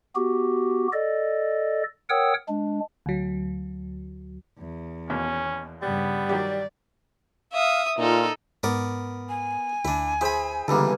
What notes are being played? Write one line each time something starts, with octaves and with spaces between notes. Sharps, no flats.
B3 F#4 G4
A4 D5 D#5
A#4 C#5 F#5 G5 D#6 E6
G#3 D4
D2 F#3
E2
D#2 B2 A#3 C#4
G2 C#3 G3 B3
D#3 F#3 G4 D5
E5 F5 D#6
A#2 D#4 F4 A4
G#2 B3 A#4 D5
G#5
D2 D4 E4
E4 G#4 C5 B5
C#2 G2 D3 E3 A#3 B3 A4